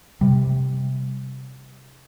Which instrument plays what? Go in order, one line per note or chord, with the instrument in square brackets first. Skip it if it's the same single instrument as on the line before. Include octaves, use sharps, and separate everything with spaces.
[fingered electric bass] C3 G3